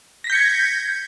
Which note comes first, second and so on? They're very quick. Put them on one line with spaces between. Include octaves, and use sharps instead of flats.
A#6 B6 G6 C#7 G#6